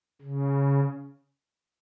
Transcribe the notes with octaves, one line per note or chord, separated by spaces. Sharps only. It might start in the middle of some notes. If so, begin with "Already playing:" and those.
C#3